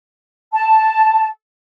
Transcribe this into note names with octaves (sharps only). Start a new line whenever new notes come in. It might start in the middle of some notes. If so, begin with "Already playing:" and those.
A5